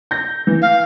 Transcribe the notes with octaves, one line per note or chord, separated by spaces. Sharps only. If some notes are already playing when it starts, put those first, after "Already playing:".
G6 A#6
E3
F5